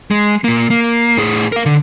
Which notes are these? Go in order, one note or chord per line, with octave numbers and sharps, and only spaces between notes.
G#3
A#2 A#3
A#3
A2 G#4
A#4 F5
D3